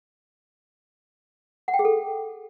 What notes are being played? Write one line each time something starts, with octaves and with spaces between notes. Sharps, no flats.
F#5
G5
G#4
A4